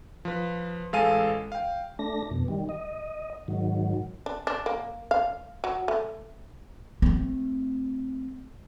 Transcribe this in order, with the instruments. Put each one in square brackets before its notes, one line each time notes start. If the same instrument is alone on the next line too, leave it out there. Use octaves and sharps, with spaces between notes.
[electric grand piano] F3 B4
A1 G#3 A4 F5 G#5 D#7
F5 G5
[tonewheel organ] A3 D4 A#6
F2 B2
D#3 G3
D#5
G#2 D#3 F#3
[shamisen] D4
D4
A#3
F5
F#3
A3
[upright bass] A3 C4